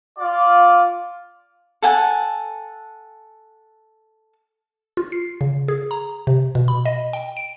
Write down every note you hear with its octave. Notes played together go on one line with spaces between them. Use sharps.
F4 D5
A4 F#5 G#5
F4
C7
C#3
G#4
A#5
C3
B2
B5
D#5
G5
D7